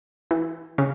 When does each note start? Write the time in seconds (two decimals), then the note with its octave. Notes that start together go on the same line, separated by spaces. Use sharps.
0.31 E3
0.78 C#3